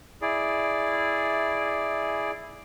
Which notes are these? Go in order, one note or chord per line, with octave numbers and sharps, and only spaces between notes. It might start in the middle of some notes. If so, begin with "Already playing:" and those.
E4 G#4 D5